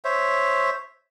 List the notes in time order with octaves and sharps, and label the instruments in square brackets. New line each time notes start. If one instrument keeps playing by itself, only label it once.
[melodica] C5 C#5 E5